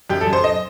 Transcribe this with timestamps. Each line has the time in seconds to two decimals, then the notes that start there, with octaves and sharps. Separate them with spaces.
0.10 F#2 G4
0.21 A4
0.27 F#2
0.33 C5
0.44 D#5